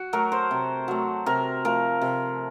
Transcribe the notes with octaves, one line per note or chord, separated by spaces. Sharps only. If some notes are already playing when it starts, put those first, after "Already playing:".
Already playing: F#4
F#3 A3 A#4
C5
C3
F#3 A3
C3 A#4
F3 A3 A#4
C3